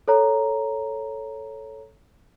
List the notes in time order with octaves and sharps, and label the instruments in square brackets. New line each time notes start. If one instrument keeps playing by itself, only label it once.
[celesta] A4 C#5 A#5